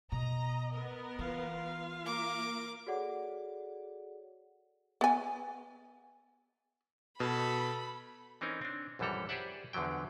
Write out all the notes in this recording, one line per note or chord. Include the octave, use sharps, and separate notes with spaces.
B2 D#5 A#5
B3 A#4
E3 F4 F5
A#3 A#4 D6
F#4 G#4 A4 C#5 D5 F#5
B3 G#5
B2 A4 B5
E3 C4 C#4 D#4 A#4
C4 D4
A#1 F#2 E3 G3 A4 A#5
G4 G#4 C5 D5 E5 F#5
E2 D3 F3 F#3 G5